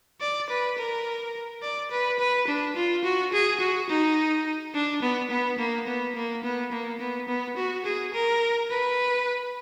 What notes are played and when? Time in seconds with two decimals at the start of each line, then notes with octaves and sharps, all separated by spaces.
0.21 D5
0.49 B4
0.78 A#4
1.62 D5
1.91 B4
2.19 B4
2.47 D4
2.76 F4
3.04 F#4
3.33 G#4
3.60 F#4
3.89 D#4
4.74 D4
5.02 B3
5.30 B3
5.58 A#3
5.87 B3
6.15 A#3
6.44 B3
6.72 A#3
7.00 B3
7.28 B3
7.57 F#4
7.85 G#4
8.13 A#4
8.70 B4